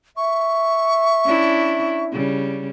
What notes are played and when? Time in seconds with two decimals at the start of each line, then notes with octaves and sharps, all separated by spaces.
0.17 E5 C#6
1.25 C#4 D4 E4
2.12 C#3 G3